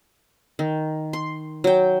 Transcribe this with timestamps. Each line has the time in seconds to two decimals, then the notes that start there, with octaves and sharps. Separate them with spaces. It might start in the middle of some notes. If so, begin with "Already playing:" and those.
0.59 D#3
1.13 C6
1.64 F#3 G5